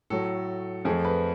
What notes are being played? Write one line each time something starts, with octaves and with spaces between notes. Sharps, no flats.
A2 F#3 A3 A4
F2 F3 A3 G#4
B4